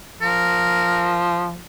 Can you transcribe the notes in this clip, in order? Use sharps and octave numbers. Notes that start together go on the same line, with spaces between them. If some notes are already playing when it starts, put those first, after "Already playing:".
F3 A#4